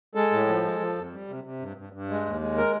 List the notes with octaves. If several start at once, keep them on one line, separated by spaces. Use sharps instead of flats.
G#3 A4
A2
F3
G#3
F3
F2
G3
C3
C3
G2
G2
G2
G#3
D#2
G#3
A#4